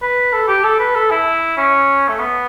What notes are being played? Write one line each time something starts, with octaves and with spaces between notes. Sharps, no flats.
B4
A4
G4
A4
B4
A4
E4
C#4
A3
B3